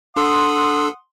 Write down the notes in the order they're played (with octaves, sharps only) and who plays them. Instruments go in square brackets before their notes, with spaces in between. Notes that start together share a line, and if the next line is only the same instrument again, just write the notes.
[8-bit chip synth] D4 A4 E6 [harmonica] F#5 D#6 [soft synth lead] C6